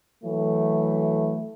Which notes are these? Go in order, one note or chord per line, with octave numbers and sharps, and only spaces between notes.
E3 F#3 A3